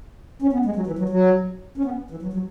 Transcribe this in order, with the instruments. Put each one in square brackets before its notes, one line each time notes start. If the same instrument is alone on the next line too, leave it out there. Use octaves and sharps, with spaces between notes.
[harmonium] C#4
B3
G#3
F#3
E3
F#3
F#3
C#4
B3
E3
F#3
F#3